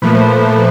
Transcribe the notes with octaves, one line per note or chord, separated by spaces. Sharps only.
A#2 F3 A3 B4
C5